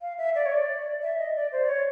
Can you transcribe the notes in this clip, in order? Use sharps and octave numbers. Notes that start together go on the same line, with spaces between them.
F5
E5
D5
C#5
D5
E5
D#5
D5
C5
D5
C#5